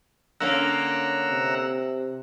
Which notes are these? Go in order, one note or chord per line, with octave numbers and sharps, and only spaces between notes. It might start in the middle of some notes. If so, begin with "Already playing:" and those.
D3 A#3 C#4 F#5 A#5 E6
C3